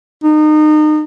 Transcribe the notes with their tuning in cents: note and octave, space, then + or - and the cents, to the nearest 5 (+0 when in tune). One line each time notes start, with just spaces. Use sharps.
D#4 -30